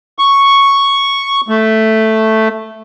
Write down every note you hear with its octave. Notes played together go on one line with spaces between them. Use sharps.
C#6
A3